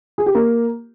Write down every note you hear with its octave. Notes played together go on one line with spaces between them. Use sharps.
G#4
G4
A#3